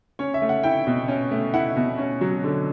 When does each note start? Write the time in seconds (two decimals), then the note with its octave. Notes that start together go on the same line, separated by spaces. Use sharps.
0.19 C#4 C#5
0.34 E5
0.42 A3
0.49 F#5
0.63 E4 G5
0.87 B2
1.08 C#4
1.31 A3
1.54 E4 F#5
1.77 B2
1.98 C#4
2.21 F#3
2.44 D3